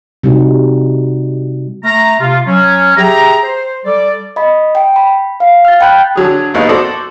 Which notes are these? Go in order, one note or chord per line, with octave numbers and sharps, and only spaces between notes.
C3 G3 D#4 F#4
A3 A#5
C3 F4
F#3 C#4
G4 G#4 E5 G5 A#5
C5
G3 A4 D5
D#5 B5
G5
B5
F5
F6 A6
G5 B5 F#6 G6
D3 F#3 G#4
A#1 D#2 B3 D#4
F#4 A4 C5 D5